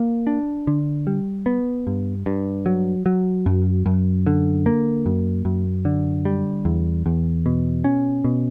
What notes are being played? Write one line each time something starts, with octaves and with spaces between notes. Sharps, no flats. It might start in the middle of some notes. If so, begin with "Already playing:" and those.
Already playing: A#3
D4
D3
G3
B3
G2
G2
F#3
F#3
F#2
F#2
D3
A#3
F#2
F#2
D3
G3
E2
E2
B2
C#4
B2